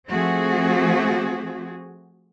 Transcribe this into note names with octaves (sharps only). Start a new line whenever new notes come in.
F3 A3 C4 F#4 G#4